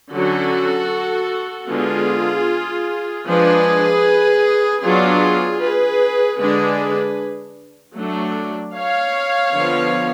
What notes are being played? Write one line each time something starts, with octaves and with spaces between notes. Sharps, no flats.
D3 F#3 C#4 F#4 A4
D3 G#3 B3 F4 G#4
F3 G#3 D4 G#4 B4
F#3 B3 D4 F4 G#4
G#4 B4
D3 G#3 D4 G#4 B4
F#3 A3 D4
C#5 F5
D3 F3 B3